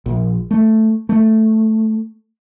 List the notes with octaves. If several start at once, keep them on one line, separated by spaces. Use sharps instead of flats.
A#1
A3
A3